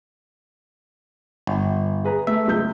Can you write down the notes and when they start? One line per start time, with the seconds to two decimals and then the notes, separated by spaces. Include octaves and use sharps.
1.47 G1
2.04 G#4 B4 A#5
2.27 A3 E5
2.48 C#2 G6